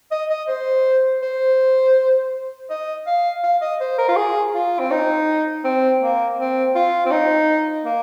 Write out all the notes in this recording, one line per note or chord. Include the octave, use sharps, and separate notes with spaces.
D#5
D#5
C5
C5
D#5
F5
F5
D#5
C5
A#4
F4
G#4
F4
C4
D#4
C4
A#3
C4
F4
C4
D#4
A#3